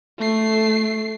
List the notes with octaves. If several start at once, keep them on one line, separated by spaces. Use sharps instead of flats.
A3 C7